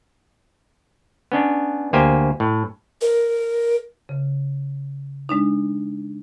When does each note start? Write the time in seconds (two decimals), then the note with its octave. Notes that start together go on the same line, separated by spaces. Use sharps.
1.32 B3 C#4 D4
1.93 D2 A#3 G4 C5 G#5
2.40 A2
3.01 A#4
4.09 C#3
5.29 G#3 D4 D#4